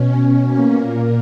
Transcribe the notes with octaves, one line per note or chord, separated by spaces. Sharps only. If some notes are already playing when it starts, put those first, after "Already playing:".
Already playing: B2 C#4
A#3
A#2 A#3